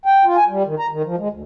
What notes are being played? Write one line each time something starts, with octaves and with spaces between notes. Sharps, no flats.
G5
F4
G#5
G3
D#3
A#5
D#3
F3
G#3
D2